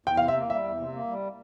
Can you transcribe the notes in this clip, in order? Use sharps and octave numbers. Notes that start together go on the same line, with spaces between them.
E2 G5
F5
C3
E5
A#3
G3 E5
E2
C3
A#3
G3